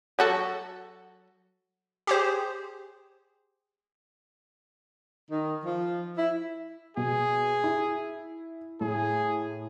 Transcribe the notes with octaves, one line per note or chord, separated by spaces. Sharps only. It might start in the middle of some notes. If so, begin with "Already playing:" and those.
F#3 F#4 A4
G4 G#4 C5
D#3
F3
E4
B2 G#4
E4
A2 G#4